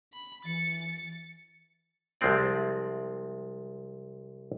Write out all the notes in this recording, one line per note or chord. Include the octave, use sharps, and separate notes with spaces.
B5
E3 A6 C#7
C2 F3 G#3 C4 D5